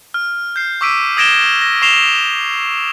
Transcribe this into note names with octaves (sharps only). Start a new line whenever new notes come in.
F6
G6 C7
C#6 D6 E6 B6 D7 D#7
D#6 G#6 A#6 D7 E7 G7
A#6
C#6 A#6 C7 E7 F7 G7